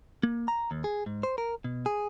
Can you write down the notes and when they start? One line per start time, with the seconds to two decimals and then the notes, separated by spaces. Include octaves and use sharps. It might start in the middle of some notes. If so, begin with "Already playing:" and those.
0.23 A#3
0.48 A#5
0.71 D#2
0.84 G#4
1.06 G#2
1.23 C5
1.38 A#4
1.64 B2
1.86 G#4